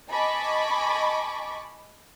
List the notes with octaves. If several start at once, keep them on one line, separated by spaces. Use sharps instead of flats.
D#5 G#5 A5 B5 C#6 D6